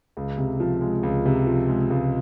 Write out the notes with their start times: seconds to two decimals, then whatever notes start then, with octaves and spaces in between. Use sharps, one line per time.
0.17 C#2
0.38 C3
0.60 F3
0.81 G#3
1.03 C#2
1.26 C3
1.47 F3
1.69 G#3
1.90 C#2